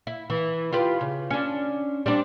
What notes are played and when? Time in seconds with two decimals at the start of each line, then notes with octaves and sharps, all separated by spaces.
0.07 E4
0.30 E3
0.72 F4 G4 B4
1.01 C#3
1.30 C#4 D4
2.06 G3 C4 D4